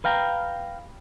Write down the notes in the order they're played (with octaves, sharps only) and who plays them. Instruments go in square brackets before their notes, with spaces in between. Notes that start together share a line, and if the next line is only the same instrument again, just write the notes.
[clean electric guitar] B4 F5 G5 A#5